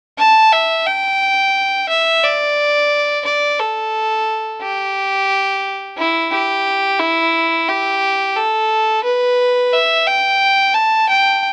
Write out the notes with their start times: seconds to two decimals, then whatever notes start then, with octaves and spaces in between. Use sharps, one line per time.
0.18 A5
0.53 E5
0.87 G5
1.89 E5
2.24 D5
3.25 D5
3.60 A4
4.62 G4
5.98 E4
6.32 G4
6.99 E4
7.69 G4
8.36 A4
9.04 B4
9.73 E5
10.07 G5
10.74 A5
11.09 G5